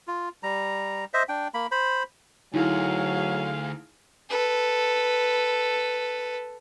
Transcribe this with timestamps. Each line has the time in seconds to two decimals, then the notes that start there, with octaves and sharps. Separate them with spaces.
0.07 F4
0.43 G3 A#5
1.14 C5 D#5 E5
1.29 D4 G5
1.54 A#3 B5
1.71 C5 B5
2.54 D2 F#3 D#4 E4 G#4 F5
4.30 A4 B4